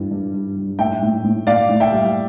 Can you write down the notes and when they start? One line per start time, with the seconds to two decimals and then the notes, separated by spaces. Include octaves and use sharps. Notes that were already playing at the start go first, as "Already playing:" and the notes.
Already playing: G2 E3 G3
0.11 G2
0.34 G2
0.57 G3
0.79 A2 E5 G5
1.02 A2
1.24 A2
1.47 A2 D5 F5
1.69 A2
1.80 E5 G5
1.92 G3